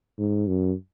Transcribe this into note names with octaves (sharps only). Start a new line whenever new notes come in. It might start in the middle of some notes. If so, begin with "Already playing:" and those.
G#2
F#2